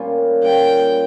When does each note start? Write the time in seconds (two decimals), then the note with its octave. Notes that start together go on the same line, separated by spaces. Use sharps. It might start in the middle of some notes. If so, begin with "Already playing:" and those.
Already playing: A#2 G3 C#4 F4
0.42 A#2 G3 C#4 F4 G5